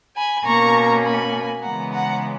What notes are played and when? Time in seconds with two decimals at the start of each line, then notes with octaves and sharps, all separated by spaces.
0.17 G#5 B5
0.46 B2 A#3 C#4 A#5 C#6
1.04 G#5 B5
1.62 C#3 E3 G#3 B3 F#5 A#5
1.92 F#5 A#5